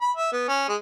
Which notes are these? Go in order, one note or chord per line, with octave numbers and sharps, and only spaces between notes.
B5
E5
B3
C#4
G#3